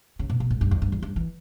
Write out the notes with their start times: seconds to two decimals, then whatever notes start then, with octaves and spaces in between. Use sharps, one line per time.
0.19 C#3
0.30 B2
0.40 B2
0.50 G#2
0.61 G2
0.71 E2
0.82 G2
0.92 E2
1.02 G2
1.16 E3